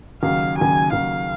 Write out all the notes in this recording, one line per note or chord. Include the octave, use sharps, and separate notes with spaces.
D#2 C#3 F#3 F5
D#2 C#3 F#3 G#5
D#2 C#3 F#3 F5